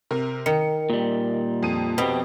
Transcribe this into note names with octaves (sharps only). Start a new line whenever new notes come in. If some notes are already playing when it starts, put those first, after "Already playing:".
C3 A#4
D#3 C#7
A#2 G3
F2 D#7
B2 B3 C4 G4